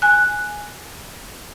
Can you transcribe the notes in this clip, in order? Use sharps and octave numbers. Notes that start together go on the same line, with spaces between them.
G#5 F#6